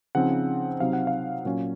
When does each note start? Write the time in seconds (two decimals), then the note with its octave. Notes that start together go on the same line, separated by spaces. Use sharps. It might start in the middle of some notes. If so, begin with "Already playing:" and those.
0.15 C#3 F3 C4 D#4 F#5
0.80 C3 F#3 C4 D#4 F5
0.93 F#5
1.07 F5
1.45 A#2 F#3 C#4